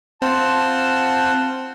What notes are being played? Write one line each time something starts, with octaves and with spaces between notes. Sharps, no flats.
C4 F4 C5 F#5 A5